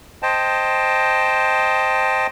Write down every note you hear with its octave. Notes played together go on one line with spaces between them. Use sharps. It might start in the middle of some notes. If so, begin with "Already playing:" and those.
C5 D#5 G5 A5